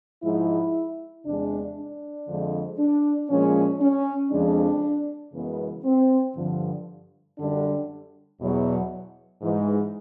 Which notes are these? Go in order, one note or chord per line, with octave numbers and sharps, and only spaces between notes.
G#2 F3 G#3 E4
E2 C3 E3 G#3 D4
D4
F2 D3 F3 G#3
D4
A#2 F3 G#3 C#4
C#4
F2 C#3 F3 G#3 D4
F#2 C#3 E3 G#3 B3
C4
G2 D3 F3
F#2 D3 G3 D4
E2 B2 F#3
G#2 E3 G#3